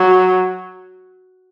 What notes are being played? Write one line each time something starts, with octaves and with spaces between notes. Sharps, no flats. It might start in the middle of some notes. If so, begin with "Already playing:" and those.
Already playing: F#3